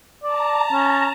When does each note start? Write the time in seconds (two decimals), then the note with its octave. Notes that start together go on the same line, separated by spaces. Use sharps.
0.23 D5 A5 A#5
0.72 C#4